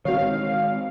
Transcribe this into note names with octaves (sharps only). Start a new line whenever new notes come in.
D#3 G#3 C4 F#4 C#5 F5